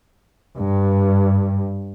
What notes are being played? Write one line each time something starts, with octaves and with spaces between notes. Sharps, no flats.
G2